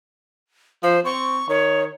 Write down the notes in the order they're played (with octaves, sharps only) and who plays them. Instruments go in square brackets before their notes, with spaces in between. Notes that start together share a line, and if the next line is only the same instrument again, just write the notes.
[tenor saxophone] F3 [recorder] C5
[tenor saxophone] C4 [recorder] C#6
[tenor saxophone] D#3 [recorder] C#5